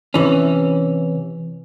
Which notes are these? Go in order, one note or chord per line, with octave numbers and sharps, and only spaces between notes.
C3 E3 C#4